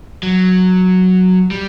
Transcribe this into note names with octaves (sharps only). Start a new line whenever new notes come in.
F#3
G3